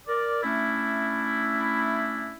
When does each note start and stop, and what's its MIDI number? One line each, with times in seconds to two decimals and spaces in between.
0.08 0.41 70
0.08 0.41 74
0.43 2.35 57
0.43 2.35 61
0.43 2.35 62
0.43 2.35 64